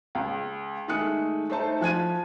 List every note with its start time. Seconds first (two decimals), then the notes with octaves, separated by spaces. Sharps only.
0.15 C#2
0.88 D#3 G#3 A3 D#6 F#6 C#7
1.50 A3 D#4 C5 A5
1.81 F3 F#6 G#6 D#7